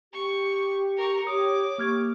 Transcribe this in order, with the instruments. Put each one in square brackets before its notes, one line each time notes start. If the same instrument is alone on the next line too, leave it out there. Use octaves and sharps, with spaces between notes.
[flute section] G4 [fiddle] C#6
[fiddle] A#4 C#6
[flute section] G4 C#5 [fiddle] D6 [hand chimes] D#6
[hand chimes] A#3 F6 G#6 [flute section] G4 C#6